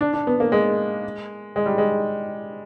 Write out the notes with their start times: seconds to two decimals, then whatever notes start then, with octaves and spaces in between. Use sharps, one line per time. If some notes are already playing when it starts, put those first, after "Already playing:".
0.01 D4
0.13 D4
0.27 B3
0.40 A#3
0.52 G#3
1.56 G#3
1.66 G3
1.78 G#3